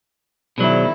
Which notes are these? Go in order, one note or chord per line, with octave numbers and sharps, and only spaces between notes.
B2 D#3 F#3 E4 G#4 C5 D5